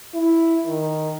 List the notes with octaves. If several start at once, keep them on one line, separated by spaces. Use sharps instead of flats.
E4
D#3